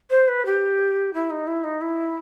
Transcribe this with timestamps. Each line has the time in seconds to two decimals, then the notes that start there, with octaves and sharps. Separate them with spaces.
0.10 C5
0.28 B4
0.45 G4
1.13 E4
1.30 D#4
1.47 E4
1.63 D#4
1.81 E4